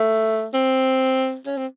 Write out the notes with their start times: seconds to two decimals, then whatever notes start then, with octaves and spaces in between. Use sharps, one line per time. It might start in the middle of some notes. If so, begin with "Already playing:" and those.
Already playing: A3
0.54 C4
1.46 C#4
1.57 C4